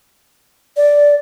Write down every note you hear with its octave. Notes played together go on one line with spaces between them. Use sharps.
D5